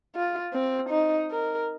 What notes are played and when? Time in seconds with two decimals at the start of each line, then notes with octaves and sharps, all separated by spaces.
0.16 F4
0.53 C4
0.90 D#4
1.31 A#4